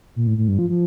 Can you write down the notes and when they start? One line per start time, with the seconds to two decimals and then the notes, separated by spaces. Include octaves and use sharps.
0.16 A#2
0.27 A2
0.38 A2
0.48 G2
0.59 F3
0.70 F3